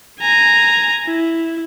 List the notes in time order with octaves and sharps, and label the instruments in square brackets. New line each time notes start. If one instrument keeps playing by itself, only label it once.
[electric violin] G#5 A#5
E4